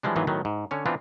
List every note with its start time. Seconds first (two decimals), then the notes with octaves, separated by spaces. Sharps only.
0.03 E3 F3 G3 G#3 D4
0.16 G#2 D#3 E3 F#3 B3 F4
0.27 A2 D#3 F#3 B3
0.45 G#2
0.71 D3 C#4 C#5
0.86 E3 B3 C4 D4 F4